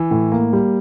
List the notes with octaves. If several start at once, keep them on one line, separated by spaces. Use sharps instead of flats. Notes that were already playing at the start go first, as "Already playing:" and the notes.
Already playing: E3
A2
A#3
G3